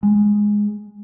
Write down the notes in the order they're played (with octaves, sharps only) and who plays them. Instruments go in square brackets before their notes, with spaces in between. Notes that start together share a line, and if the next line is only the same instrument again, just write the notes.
[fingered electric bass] G#3